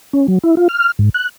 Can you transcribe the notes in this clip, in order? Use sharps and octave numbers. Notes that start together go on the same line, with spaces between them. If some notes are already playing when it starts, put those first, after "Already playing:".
C#4
F#3
E4
F4
F6
G#2
F#6